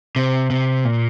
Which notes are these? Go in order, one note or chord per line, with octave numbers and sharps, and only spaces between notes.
C3
C3
A#2